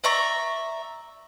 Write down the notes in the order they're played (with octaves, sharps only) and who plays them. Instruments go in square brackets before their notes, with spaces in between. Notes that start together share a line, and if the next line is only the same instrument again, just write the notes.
[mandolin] D5 E5 A#5 C#6